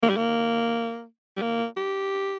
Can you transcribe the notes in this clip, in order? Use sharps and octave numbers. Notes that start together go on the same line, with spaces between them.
A#3
G3
A#3
G3
A#3
G4